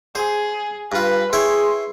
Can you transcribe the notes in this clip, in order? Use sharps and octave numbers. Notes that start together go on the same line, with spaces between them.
G#4 C5
G2 F4 B4
E4 G#4 C#5 G5 C6